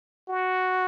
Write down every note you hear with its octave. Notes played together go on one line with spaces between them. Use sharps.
F#4